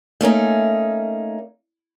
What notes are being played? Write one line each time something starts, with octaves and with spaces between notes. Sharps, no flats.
A3 A#3 C#4 D#4